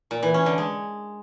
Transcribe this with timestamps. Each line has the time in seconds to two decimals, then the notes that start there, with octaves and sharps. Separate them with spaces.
0.11 A#2
0.23 E3
0.34 C#4
0.46 D3
0.58 G#3